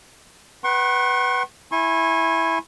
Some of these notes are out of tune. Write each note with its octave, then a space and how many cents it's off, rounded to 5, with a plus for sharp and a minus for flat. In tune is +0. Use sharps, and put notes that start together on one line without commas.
B4 +0 F#5 +35 C#6 -45
E4 +0 G#5 +0 C#6 -40